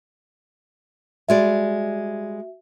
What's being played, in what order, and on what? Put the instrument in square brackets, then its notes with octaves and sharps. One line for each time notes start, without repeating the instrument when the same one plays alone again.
[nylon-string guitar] G3 G#3 D5 [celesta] F#4 E5